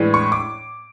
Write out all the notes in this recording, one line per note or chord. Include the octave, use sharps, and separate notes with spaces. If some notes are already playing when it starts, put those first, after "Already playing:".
Already playing: A2 E3 G#3 D4
C#6
D6